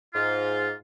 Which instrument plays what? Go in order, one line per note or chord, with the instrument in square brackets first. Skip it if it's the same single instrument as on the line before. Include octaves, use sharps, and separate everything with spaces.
[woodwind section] G#2 F4